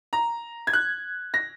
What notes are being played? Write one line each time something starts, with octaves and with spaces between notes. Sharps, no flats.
A#5
G#6
F#6
A#6